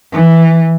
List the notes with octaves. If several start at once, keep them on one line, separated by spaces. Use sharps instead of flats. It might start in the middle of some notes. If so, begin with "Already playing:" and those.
E3